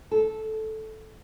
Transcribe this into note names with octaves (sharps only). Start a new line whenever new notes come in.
A4